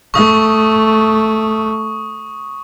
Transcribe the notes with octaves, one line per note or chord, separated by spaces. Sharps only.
A3 C#6 D#6